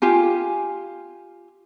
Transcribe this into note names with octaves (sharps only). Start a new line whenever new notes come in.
F4 G4 G#5